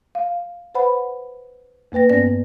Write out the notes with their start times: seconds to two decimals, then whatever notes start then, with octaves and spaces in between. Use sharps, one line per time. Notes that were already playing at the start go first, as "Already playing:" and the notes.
0.15 F5
0.75 B4 C5 F#5 B5
1.92 F2 A#3 B4 G5 A#6
2.10 G2 B3 C#4 D5 A#6